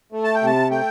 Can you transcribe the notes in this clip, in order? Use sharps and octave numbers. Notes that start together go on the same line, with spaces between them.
A3
A5
G5
C3 A5
A3 G5